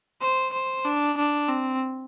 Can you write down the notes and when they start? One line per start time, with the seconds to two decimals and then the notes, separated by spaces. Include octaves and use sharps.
0.21 C5
0.53 C5
0.85 D4
1.17 D4
1.48 C4